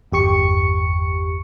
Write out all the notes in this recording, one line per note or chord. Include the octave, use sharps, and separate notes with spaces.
G1 E2 G4 C#6 C#7